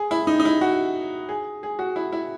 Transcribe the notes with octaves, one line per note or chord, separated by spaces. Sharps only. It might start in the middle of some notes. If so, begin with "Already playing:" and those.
Already playing: G#4
E4
D#4
D#4
E4
F#4
G#4
G#4
F#4
E4
E4